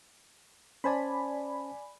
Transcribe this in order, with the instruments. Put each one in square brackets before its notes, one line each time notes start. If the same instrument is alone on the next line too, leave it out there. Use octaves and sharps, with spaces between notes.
[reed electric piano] C#4 C5 A5 [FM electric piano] D5 G#5 B5